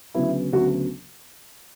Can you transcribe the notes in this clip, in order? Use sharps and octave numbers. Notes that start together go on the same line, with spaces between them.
D2 C#3 F#3 B3 E4
D2 C#3 F#3 B3 F#4